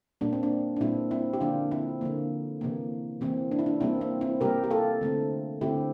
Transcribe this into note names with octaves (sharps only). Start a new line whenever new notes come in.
A#2 G3 A#3 D4
C4
D4
D4
A#2 G3 A#3 C4 E4
C4 E4
G4
D3 F3 A#3 D4 F4
C4 E4
D3 F3 A#3
C3 E3 A#3
C3 E3 A#3 C4
D4
E4
D4
C3 G3 A#3 C4 E4
C4
C4 E4
C3 G3 A#3 G4 A#4
G4
F4 A4
D3 A3 C4
D3 A3 C4 E4 G4